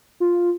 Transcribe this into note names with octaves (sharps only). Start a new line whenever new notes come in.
F4